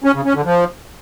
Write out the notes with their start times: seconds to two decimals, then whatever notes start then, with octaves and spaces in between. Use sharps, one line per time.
0.04 C#4
0.14 C#3
0.25 C#4
0.35 D3
0.45 F3